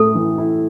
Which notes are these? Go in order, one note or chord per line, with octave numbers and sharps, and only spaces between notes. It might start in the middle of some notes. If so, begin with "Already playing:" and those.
Already playing: A2 A3 A4
E3
E4